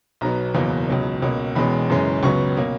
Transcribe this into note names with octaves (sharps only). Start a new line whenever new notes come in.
B1 B2 F#3 B3 A#5
F#1 E2 B2 F#3 A#3
C#2 B2 F#3 C#4
C#2 B2 A#3 C#4
E1 E2 B2 G#3 C#4 B5
F#1 F#2 E3 G#3 C#4
C#2 C#3 F#3 B3 C#6
B2 A#3 C#4